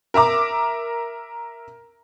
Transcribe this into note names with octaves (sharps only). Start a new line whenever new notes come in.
A#4 E5 A#5 D6